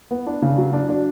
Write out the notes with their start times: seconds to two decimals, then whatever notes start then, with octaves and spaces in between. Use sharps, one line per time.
0.11 B3
0.27 D4
0.42 C#3
0.58 F#3
0.73 D4
0.89 D4